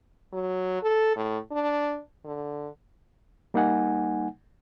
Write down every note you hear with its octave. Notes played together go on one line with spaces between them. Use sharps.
F#3
A4
A2
D4
D3
G3 A#3 D#4 F#5 G#5